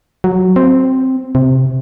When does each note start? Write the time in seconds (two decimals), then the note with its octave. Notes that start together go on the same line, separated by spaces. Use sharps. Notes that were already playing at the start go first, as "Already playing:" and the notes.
0.24 F#3
0.56 C4
1.35 C3